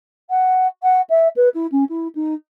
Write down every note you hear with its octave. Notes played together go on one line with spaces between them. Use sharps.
F#5
F#5
E5
B4
E4
C#4
E4
D#4